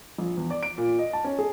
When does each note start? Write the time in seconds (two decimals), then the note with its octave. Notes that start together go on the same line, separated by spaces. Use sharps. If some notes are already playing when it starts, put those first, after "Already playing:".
0.18 A#1
0.37 E2
0.50 D5
0.63 D7
0.78 A#2
0.99 D#5
1.13 A5
1.24 C#4
1.39 G#4